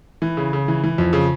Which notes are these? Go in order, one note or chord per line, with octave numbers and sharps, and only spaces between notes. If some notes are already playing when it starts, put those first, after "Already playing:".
E3
C#3
C#3
E3
E3
F2
C#3